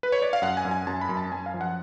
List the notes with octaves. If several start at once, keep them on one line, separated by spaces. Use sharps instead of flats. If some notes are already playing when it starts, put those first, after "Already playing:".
B4
C#5
D5
F5
F#2 F#5
G#5
F#2
G#5
F#2 A5
B5
F#2
A5
F#2 G#5
F5
F3
F#5